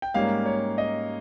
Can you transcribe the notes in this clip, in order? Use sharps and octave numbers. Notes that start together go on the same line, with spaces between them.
G5
G#2 G3 A#3 C#4 F5
C#5
D#5